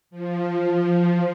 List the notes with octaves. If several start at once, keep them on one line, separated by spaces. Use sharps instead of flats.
F3